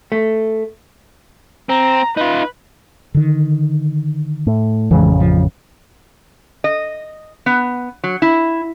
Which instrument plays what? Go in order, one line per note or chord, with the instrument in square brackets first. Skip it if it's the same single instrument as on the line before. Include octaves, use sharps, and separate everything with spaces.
[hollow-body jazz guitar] A3
[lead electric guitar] C4 [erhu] A#5
[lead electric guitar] D#4 F4 [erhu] B4
[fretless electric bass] D3 D#3
[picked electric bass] A2
[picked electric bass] A1 F2 C#3 [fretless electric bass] E3 F3 G#3
[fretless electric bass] F3
[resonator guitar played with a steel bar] D#5
B3
F#3
E4